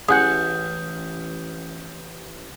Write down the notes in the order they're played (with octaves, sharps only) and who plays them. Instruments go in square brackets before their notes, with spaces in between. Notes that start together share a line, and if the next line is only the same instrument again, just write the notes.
[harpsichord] A1 [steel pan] G#4 F#5 [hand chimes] D#6 G6